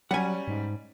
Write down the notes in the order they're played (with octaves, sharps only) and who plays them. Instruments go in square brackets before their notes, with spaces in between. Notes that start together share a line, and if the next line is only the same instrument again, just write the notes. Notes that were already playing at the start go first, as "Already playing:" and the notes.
[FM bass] F#3 [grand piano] G3 C#4 [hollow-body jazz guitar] F#5 G#5
[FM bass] G#2